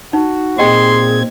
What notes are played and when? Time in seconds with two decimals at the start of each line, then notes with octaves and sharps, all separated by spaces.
0.13 D#4 F#4
0.58 A#2 C4 G4 G#4 D#5 G5 C6 G#6